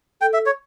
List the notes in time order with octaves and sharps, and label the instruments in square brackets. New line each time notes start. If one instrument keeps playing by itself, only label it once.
[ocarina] A4 [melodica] G5
[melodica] E5
C#5